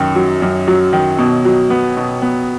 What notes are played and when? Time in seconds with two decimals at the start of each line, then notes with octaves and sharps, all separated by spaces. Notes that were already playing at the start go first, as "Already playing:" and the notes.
Already playing: F#2 D#3
0.16 F#3
0.42 F#2
0.68 F#3
0.93 D#3
1.19 B2
1.45 F#3
1.70 B3
1.97 B2
2.22 B3